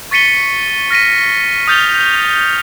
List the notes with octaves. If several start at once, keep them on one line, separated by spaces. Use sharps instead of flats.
C#6 A6 B6 C#7 D#7 G7
F6 A#6 B6 D#7
D#6 F6 G6 A6 F7 G7